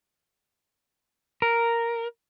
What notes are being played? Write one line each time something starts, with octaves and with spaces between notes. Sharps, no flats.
A#4